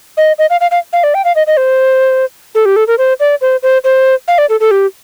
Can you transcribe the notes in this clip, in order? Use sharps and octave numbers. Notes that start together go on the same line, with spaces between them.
D#5
D#5
F5
F5
F5
F5
D5
G5
F5
D#5
D#5
C5
A4
G4
A4
A#4
C5
D5
C5
C5
C5
F5
D5
A4
A4
G4